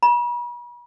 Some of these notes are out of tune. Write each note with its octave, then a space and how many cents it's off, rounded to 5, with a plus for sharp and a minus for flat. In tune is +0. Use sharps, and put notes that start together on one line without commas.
B5 -45